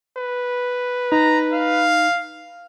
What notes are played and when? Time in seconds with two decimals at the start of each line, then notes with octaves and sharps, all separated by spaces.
0.17 B4
1.12 D#4 A#5
1.53 F5